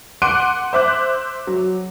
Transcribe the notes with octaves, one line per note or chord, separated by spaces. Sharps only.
F#5 C6 D6 F#6 D7 D#7
C5 E5 D6 F#6
F#3